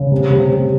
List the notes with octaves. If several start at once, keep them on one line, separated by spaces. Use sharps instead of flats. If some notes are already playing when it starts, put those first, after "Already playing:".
Already playing: C#3
C3
C3
C3